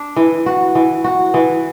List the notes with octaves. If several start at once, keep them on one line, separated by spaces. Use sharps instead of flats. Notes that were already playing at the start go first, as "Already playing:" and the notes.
Already playing: D4
E3
F#4
E3
F#4
E3